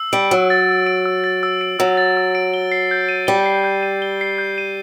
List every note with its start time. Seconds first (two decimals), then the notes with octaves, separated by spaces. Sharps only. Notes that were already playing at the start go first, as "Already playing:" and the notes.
Already playing: E6
0.13 G3 D7
0.31 F#3 E6
0.50 A6
0.69 E6
0.87 D7
1.06 E6
1.24 A6
1.43 E6
1.61 D7
1.79 F#3 E6
1.97 A6
2.17 E6
2.35 D7
2.54 G7
2.72 C7
2.91 G6
3.09 D#7
3.27 G3 G7
3.46 C7
3.64 G6
3.83 D#7
4.02 G7
4.21 C7
4.38 G6
4.58 D#7